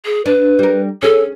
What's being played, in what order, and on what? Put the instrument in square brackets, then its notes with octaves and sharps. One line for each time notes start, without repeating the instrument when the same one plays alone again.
[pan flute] G#4
[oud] D4 [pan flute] B4
[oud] G3 A#4
[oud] C#4 G#4 [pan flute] A4